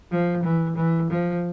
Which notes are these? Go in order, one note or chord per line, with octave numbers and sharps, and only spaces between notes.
F3
E3
E3
F3